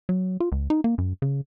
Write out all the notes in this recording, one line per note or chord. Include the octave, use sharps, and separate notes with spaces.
F#3
F4
C#2
D#4
A#3
F#2
C#3